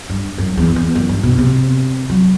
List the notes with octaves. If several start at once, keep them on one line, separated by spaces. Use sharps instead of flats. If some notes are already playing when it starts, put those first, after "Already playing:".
G2
F#2
E2
E2
F#2
G2
B2
C3
F#3